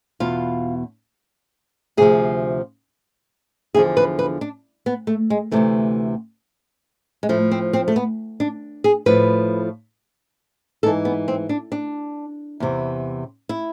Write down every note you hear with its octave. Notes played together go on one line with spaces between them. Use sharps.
E2 B2 F4
D2 C3 F3 G#4
E2 D3 F3 G#4
B4
B4
D4
B3
A3
G#3
D2 C3 E3 A3
G#3
A2 F3 A3
C4
C4
A3
B3
D4
G#4
A2 F3 B4
G#2 E3 A4
B3
C4
D4
D4
E2 C3 E3
E4